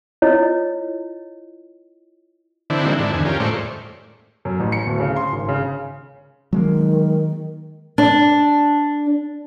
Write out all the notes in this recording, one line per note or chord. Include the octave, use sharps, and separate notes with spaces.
E4 F4 C#5 D#5
D3 E3 C4 D4 E4
E3 G#3 A#3 C4 D#4 F#4
G#2 D3 D4 E4
E2 D3 D#3 G#5
C#4 F4 G4 A#4
A2 G#3 A3 C5 D5 C#6
F#2
A1
C#7
D1
C#3
C6
G#1
C#3
D#3 F#3 G#3 A#3
D4